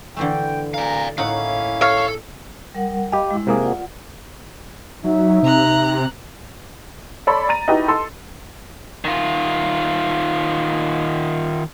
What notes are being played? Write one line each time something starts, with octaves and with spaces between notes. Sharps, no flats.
D3 E3 A3 G5
D5 F5 G#5 A#5
A2 A#3 C#4 D#4 E4 F5 F#5
A4 C#5 F5
G3 A#4 F#5
G4 D#5 F5 G5 B5
G#3 E4
C3 A#3 G#4
F4 D5 F#5
F#3 D#4 E5
C3 A#5 F#6
A4 C#5 D5 B5 C6
A#5 A6 D#7
D#4 E4 F#4 G4 B4 D#5
A4 C6
D#3 F4